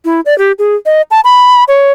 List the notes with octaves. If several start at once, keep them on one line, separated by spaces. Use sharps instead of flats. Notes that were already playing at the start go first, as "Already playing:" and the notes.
E4
D5
G4
G#4
D#5
A5
B5
C#5